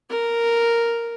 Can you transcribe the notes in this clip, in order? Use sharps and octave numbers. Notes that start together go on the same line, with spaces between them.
A#4